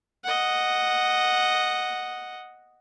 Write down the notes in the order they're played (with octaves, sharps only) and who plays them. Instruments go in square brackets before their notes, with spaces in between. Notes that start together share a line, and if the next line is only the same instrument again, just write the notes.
[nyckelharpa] D#5 F#5